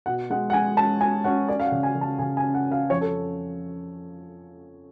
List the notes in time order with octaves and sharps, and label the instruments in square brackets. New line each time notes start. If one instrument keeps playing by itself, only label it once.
[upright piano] B2 F#5
G#3 F#5
F#5
G#3 G#5
C#4 A5
C#4 G#5
C#4 F#5
C#4 D5
F5
F#5
C#3
G#5
C#3
A5
C#3 G#5
G#5
C#4
F#5
C#4
F5
F2 C#5
A4